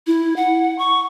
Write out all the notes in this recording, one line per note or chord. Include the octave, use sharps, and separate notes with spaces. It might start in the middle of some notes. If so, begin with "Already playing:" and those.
E4
F#5
C#6